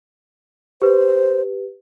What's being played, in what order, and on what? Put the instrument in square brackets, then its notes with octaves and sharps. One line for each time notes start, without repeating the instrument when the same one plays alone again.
[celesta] G4 B4 [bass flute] C5